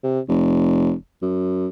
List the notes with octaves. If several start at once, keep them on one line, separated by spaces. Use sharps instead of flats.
C3
F1
F#2